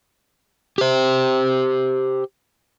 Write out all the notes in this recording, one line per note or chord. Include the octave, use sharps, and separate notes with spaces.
G4 C5